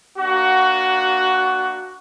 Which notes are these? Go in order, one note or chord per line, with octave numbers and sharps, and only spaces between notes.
A#3 D4 F#4